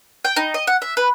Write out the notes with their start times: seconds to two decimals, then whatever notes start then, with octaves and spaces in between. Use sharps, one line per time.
0.25 G5
0.36 D#4
0.54 D#5
0.67 F#5
0.82 E5
0.97 B4